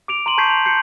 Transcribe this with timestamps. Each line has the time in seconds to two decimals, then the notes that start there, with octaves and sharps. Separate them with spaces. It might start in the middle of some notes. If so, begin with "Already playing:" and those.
0.08 D6 D7 F7
0.26 A#5 C6 D#7 F#7
0.38 A5 C#6 G6 G#6 B6 C7
0.50 F7
0.66 G6 C7 C#7